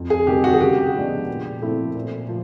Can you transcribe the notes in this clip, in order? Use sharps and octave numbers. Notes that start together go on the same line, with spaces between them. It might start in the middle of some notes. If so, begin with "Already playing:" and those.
Already playing: F2
G#4
C3 D#3 G3 G4
F#4
G#4
C#3 G4
F3 G#3 B3 D4
A#2
F3 A3 C4 E4
A#2
F3